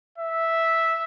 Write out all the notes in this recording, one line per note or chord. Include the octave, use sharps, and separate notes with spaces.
E5